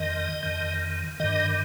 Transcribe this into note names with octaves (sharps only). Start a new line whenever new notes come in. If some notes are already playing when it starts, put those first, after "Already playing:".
Already playing: F2 D#3 D#5
F2 D#3
G2 D#3 D#5